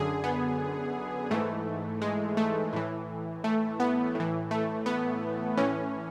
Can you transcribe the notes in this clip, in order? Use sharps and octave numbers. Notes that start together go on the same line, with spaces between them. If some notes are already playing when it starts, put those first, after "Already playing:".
Already playing: F#2 D3 G#4
B3
G#2 E3 A3
G#3
A3
A2 E3
A3
B3
A2 E3
A3
B3
A2 E3 C#4